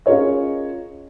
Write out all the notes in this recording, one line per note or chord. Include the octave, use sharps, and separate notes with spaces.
C#4 F4 G#4 A#4 C#5 D#5